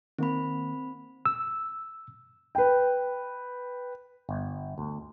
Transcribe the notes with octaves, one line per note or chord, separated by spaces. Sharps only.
D#3 A#3 C4 B5
E6
B4 G5
G1
D2